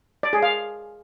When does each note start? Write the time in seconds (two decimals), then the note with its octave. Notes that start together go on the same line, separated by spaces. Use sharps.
0.23 D5
0.33 G#4
0.43 F5